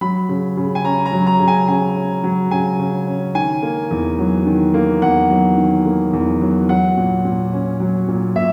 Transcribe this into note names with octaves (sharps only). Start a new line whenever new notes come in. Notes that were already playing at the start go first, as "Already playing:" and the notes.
F#3 B5
C#3
C#3
G#5
C#4 A#5
A#5
F#3
A#5
C#3
G#5
C#3 G#5
C#4
F#3
C#3 G#5
C#3
C#4
D#3 G#5
A#3
E2
F#3
D#3
A#3
E2 F#5
F#3
D#3
A#3
E2
F#3
F#3 F#5
A#2
A#2
C#4
F#3
A#2
A#2 E5